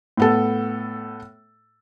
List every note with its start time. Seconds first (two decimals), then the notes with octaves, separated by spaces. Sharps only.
0.17 A2 B3 A4